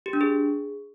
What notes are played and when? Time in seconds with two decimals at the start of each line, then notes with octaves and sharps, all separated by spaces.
0.06 G4
0.13 D4
0.21 G#4